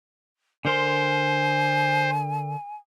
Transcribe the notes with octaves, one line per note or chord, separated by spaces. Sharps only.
D3 A#4 C5 G#5 C6